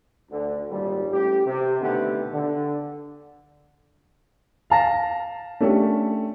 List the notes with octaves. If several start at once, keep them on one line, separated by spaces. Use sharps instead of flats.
D2 D3
G#1 D#2 A#2 G3
A1 G4
C3
B2 D3 D#3 A3 B3 G4
D3
F5 A5 A#6
A3 C#4 D4 F4 G4 A4